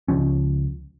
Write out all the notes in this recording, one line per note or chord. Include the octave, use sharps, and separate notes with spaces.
C#2 F3 C#4